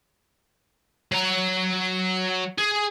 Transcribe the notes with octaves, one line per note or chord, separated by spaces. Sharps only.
F#3 A#5
G#4